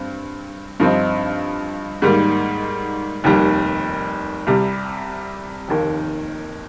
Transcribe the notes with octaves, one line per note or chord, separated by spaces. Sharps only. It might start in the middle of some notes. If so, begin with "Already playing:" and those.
Already playing: G2 C4
G2 F3 C4 D#4
G#2 D#3 G3 A#3
F1 D#2 D#3 G3
C2 C3 G3
F1 D#2 D#3 A#3